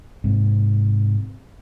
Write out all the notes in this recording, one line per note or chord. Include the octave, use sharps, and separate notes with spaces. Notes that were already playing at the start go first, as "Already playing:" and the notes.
G#2 C3